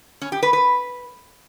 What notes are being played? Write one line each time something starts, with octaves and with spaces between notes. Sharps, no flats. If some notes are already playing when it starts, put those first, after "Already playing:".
C#4
G4
B4
B4